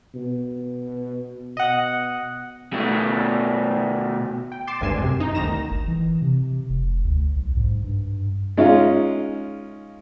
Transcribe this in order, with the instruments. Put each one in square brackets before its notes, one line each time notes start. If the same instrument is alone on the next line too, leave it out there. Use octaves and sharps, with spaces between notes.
[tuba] B2
[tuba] B2 [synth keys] D#5 F#5
[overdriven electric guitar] B2 A3
[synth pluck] G5
C6 D6 A6 C7 E7
G#1 D2 G2 G#5 C7 E7
F#2 C3
D#4
G1 D2 D#3 A#5 A#6 E7
[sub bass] G1
E3
C3
F1
D2
B1
G#2
G2
[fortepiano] G#3 C#4 D#4 F4